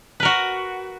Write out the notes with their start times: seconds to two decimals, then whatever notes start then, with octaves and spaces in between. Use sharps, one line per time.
0.20 B4
0.23 A#4
0.25 F#4